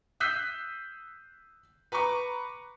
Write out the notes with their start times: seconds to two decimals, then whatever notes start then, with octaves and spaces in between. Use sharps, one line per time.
0.20 D#6 E6 F#6 G6 B6 C7
1.92 B4 A#5 B5 C#6 D6